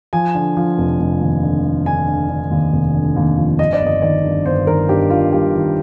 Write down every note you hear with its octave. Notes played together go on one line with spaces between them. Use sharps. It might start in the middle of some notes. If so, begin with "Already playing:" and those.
F3 G#5
D3
F3
F1
F1
D#2
D3
D3
D3 G#5
D3
D3
D#2
F1
D3
D#2
F3
G2 D#5
D5
G1
D#5
D#3 D5
G2
G1 C5
D#3 A#4
G2 G4
G2 F4
G3 G4
D#3